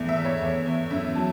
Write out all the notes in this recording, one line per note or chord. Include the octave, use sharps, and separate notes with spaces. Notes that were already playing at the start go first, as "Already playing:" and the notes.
Already playing: E2 A3
E5
E2
C#5
E2
E2
F#2 E5
F#3 A5